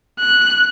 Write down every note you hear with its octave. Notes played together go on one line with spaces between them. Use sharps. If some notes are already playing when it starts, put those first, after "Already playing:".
F#6